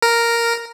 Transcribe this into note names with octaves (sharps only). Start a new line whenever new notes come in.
A#4